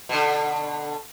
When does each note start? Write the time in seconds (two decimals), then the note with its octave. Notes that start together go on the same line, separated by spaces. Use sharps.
0.09 B2 D3